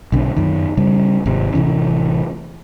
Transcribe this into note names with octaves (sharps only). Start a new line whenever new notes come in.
B1 D3 C4
F#2 D#3
C#3 G3
G#1 C3 C4
A1 C3 E3 C#4